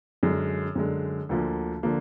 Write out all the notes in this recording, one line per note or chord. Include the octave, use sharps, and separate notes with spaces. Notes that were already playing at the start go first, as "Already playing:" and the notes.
F#2 D3 G#3
F#2 D3 G#3
D2 D3 F3 A#3
D3 F3 A#3